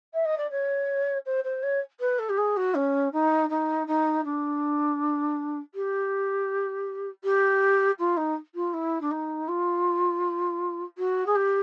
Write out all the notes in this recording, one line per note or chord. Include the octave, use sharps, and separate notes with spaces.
E5
D#5
D5
C#5
C5
C5
C#5
B4
A4
G4
G#4
F#4
C#4
D#4
D#4
D#4
D4
G4
G4
F4
D#4
F4
E4
D4
D#4
F4
F#4
G#4
G4